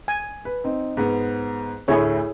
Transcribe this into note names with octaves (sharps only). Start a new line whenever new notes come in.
G#5
B4
C4 D#4
G#2 B3
D2 A2 E4 G#4 C#5